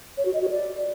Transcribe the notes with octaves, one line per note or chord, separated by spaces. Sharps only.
C#5
F#4
D#5
F#4
D5